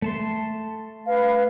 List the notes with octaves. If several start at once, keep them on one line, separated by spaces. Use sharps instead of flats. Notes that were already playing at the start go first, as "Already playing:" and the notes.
A3 A5 C6
B4 F5